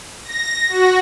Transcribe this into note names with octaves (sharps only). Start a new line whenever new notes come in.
A#6
F#4